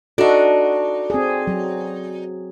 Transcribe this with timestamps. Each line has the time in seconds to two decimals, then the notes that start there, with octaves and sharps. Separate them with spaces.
0.18 D4 D#4 F#4 A4
1.10 C4 G#4
1.47 F#3